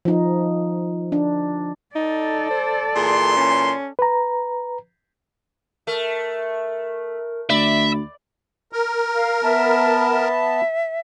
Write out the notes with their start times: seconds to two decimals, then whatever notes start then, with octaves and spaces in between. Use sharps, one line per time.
0.05 F3 D#4
1.12 D4
1.95 D#4 A4 D5
2.50 C5
2.96 A#2 E3 G#4 C6
3.37 C#4
3.99 B4 A#5
5.87 A3 A#4
7.50 D2 D5 E5 B5
8.73 A#4
9.15 F5
9.43 B3 E5 A5
10.11 E5